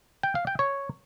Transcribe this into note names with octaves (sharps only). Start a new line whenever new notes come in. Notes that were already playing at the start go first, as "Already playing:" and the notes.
G5
F5
G5
C#5